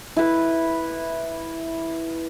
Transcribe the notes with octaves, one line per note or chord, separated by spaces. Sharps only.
E4 B4